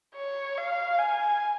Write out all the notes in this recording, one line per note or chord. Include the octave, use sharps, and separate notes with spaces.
C#5
F5
G#5